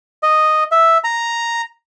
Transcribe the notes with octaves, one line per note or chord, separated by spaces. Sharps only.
D#5
E5
A#5